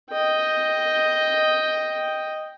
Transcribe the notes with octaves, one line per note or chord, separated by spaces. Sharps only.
D#5 G5